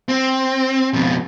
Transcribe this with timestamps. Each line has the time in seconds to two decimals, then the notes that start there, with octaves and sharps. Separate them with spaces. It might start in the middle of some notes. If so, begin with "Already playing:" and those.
0.09 C4
0.93 F2 B2